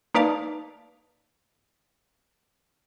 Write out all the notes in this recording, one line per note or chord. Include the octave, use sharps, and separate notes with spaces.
A#3 D#4 B4 D5 F5 A5